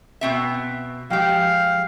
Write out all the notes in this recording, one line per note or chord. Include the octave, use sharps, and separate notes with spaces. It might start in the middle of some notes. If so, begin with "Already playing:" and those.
B2 C4 E5
F3 G#3 G4 F5 G5